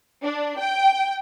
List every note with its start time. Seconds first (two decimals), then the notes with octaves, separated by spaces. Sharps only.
0.23 D4
0.58 G5